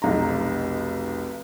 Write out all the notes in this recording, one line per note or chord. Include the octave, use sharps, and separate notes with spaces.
F1 B1 A#5